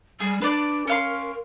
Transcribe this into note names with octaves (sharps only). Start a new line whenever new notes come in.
G3 G#4
D4 B4 D5
C#4 A#4 F5 C6